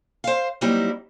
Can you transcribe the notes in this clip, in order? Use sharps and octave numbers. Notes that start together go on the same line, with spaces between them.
C5 F5
F#3 G3 A#3 C4 D#4 E4